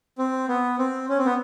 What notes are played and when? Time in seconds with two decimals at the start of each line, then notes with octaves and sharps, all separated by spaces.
0.18 C4
0.49 B3
0.78 C4
1.09 C#4
1.18 C4
1.25 B3